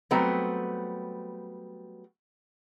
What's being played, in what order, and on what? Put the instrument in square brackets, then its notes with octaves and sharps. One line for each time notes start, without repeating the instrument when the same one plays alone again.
[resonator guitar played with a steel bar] F#3 G3 A3 B3 C4